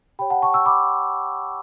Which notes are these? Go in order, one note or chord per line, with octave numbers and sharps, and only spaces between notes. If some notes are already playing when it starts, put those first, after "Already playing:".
G4 C#5 G5 B5
F#5 A5
A5 C#6
C#6 E6
B5 D6